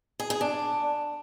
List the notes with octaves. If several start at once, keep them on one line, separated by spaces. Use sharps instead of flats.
G#4
G#4
D4